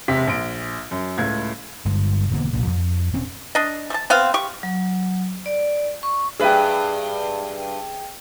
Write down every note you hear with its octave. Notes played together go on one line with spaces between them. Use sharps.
E1 C3 B6
A#1 D7
F#2
C#2 A2 G#6
G1 G2 G#3
E1 B2 D3 A#3
B1 A#2
F2
D#1 C4 C#4
D4 D#5
A3 A5
B3 C4 F5
G4 C#6
F#3
D5
C#6
G2 G#4 B4 E5 G5